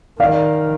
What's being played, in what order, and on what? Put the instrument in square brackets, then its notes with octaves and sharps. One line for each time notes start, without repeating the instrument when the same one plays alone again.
[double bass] D#3 [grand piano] D5 F5